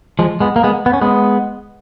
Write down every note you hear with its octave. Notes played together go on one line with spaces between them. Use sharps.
F3 G#3
G#3 B3
A#3
G#3 B3
B3
C#4
G#3 B3